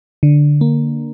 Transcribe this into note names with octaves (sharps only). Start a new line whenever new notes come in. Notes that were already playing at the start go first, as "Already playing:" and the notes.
D3
A#3